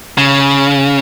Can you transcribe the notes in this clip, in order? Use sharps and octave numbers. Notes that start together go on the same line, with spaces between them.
C#3